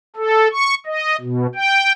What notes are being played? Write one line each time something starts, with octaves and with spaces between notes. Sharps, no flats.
A4
C#6
D#5
B2
G5